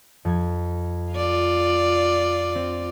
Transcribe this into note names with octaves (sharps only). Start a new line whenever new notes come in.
F2 G#6
F4 D5
C4